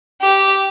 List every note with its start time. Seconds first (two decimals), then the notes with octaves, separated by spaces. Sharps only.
0.21 G4